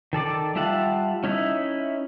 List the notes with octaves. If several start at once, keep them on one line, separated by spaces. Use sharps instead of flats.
D#3 A4 D5 D6
G3 F4 E5 F#5 A5
C#4 D#4 E4 E5